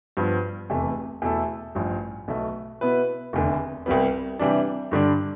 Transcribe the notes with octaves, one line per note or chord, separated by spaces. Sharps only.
G2 F3 B3
F1 E2 C3 E3 A3
E2 B2 A3 E4 A4
A1 G2 F3
B1 B2 A3
B2 B3 E4 B4
F1 E2 D3
C2 C3 G3 B3
C3 E3 G3 D4
G2 D3 G3 D4